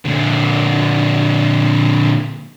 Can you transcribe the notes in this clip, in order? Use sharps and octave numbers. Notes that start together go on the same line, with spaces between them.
A#2 D3